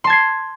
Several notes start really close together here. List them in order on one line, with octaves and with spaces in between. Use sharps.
C6 A5 G#6 C7